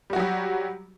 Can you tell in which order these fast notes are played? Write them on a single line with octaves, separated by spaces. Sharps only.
G3 F#4 F#3 G4